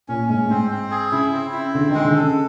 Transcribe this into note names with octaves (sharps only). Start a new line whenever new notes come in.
A#2 C#4
G#2 C#4
A2
G#2 C4
C4
G#4
C#3 E4
C4
E4
D3 C4
D#3 G#3
D3
C#3 A4